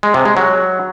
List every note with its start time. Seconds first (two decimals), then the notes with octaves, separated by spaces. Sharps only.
0.03 G#3
0.14 C3
0.25 G#3
0.37 F#3